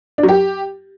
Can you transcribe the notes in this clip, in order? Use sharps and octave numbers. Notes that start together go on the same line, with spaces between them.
D4
F#3
G4